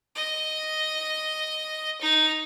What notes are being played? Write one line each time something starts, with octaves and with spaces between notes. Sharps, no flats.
D#5
D#4